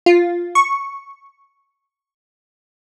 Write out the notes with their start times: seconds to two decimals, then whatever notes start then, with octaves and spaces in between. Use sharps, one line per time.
0.06 F4
0.55 C#6